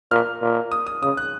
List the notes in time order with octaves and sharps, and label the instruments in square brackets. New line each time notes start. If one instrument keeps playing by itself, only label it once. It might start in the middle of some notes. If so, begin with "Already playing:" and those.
[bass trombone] A#2 [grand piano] F6
[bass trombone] A#2
[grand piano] D#6
D#6
[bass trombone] C#3 [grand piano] D#6
[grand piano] F#6